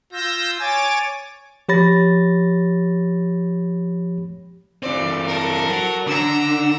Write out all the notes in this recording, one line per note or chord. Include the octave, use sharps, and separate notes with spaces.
F4 E6 G6 A#6
C#5 G#5 D6 A6
F3 G4 C#5 B5 A6 A#6
E3 C4 D5
A4 A#4
F#3
D3 A#5 E6